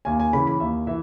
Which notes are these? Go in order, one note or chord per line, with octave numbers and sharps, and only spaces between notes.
D#2 G#5
G#5
C#3 E3 B5
B5
D#2 E5
E3 E5